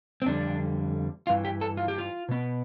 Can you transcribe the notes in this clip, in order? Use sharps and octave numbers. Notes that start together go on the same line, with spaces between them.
C4
F2 D3 G3 D4
G2 E3 F4
G4
A4
F4
G4
F4
B2 B3